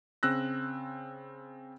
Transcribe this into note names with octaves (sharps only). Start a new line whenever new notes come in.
C#3 C4 E6 F#6 A#6